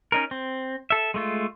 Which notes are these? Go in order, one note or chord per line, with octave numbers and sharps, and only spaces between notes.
C#4 D#4 A#4
C4
A4 E5
G#3 A3 F4